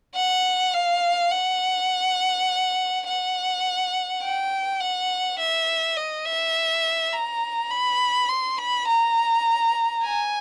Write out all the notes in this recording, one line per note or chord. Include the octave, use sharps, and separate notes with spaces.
F#5
F5
F#5
F#5
G5
F#5
E5
D#5
E5
A#5
B5
C6
B5
A#5
G#5